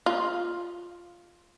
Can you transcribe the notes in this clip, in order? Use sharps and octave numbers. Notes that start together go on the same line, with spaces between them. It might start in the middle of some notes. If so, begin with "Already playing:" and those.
F4